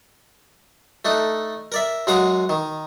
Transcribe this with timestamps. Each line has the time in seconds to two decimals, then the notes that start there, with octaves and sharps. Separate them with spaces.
1.05 A3 D4 D#4
1.72 A#4 D5 E5
2.07 F#2 G#3 F5 F#5 A#5 D#6
2.49 D#3